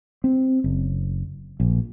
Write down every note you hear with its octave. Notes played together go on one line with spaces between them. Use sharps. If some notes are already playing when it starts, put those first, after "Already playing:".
C4
F#1
A#1